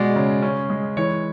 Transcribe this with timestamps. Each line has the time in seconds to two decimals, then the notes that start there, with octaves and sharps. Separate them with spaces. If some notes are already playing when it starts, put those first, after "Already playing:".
Already playing: B2 G#3 D5
0.16 C#3
0.42 C#4
0.70 G#3
0.97 E3 C#5